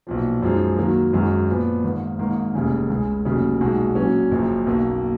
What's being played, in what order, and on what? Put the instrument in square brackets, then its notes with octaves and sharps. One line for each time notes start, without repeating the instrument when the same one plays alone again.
[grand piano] B1 A#2 F3
F#2 F3 G#3 D#4
D#2 D#3 F#3 A#3
G#1 F#2 D#3 G#3
A#2 F3 B3
G#1 G#2 D#3 A#3
G#1 G#2 D#3 A#3 D#4
F1 D#2 C#3 G#3
C#2 C#3 G#3
F1 D#2 C#3 F#3
B1 A#2 G#3 D#4 F#4
A#1 A#2 F#3 C#4
F#1 F#2 F3
B1 B2 A#3